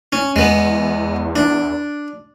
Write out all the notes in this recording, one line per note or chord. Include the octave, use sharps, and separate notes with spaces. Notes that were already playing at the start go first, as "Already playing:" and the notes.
C#4
E2 G#3 B3
D4